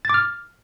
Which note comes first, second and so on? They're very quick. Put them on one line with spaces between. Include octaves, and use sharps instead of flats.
A6 D6 F6